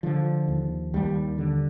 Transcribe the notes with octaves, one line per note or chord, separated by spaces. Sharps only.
D3 F3
D#2
D#2 G3
D3